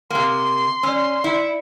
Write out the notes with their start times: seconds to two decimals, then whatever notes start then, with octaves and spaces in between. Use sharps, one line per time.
0.10 C3 A#3 C6
0.83 C#4 D5 E6
1.24 E4 D5 C#7